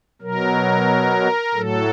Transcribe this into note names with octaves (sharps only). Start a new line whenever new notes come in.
B2 F#3 A#4
A2 F#3 A4